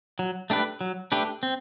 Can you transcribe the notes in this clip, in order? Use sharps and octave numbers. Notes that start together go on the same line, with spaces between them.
F#3
A3 D4 G4 B4
F#3
A3 D4 G4 B4
C4